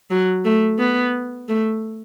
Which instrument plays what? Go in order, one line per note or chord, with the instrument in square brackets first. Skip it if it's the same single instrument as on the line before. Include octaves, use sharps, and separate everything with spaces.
[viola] F#3
A3
B3
A3